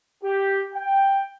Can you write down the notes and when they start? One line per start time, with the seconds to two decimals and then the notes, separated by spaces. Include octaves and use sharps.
0.23 G4
0.74 G5